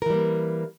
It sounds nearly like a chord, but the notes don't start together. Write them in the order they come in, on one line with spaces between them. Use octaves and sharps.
A#4 E3 G3 A#3